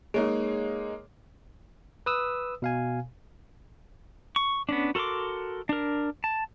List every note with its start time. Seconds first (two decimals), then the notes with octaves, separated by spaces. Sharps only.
0.14 G#3 A#3 D#4 G#4 C#5
2.06 B4 D#6 E6
2.62 B2 F5 G#5
4.36 C#6
4.69 B3 C#4 D4
4.95 F#4 A4 A#4 C6 D6
5.69 D4 A#4
6.24 A5